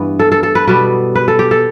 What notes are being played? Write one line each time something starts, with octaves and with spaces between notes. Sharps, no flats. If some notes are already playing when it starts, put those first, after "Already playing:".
Already playing: G2 E3 B3
A4
A4
A4
B4
B2 G3 B3 B4
B4
A4
G4
A4